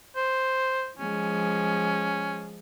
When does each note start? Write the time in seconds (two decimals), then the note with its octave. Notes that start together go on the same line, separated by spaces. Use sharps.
0.16 C5
0.99 F3 G#3 C#4